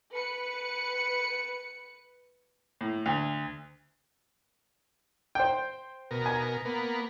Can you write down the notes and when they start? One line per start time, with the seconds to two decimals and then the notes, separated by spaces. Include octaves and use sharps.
0.12 B4 C#7
2.81 A2
3.06 D2
5.35 C5 G5
6.11 B2 A#4
6.26 G#5
6.65 A#3 B3